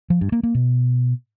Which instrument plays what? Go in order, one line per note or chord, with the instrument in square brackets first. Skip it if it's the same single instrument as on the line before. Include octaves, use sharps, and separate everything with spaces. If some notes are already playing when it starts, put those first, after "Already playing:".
[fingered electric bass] F3
G2
A#3
A#3
B2